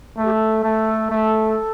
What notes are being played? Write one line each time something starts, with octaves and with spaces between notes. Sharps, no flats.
A3 A4
G4
A4
A3
A3